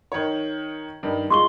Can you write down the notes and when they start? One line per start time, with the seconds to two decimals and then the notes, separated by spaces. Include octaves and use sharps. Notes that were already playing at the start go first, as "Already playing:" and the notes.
0.12 D#3 C#5
1.03 G2 D#3
1.31 G#3 F4 C6 C#6 G7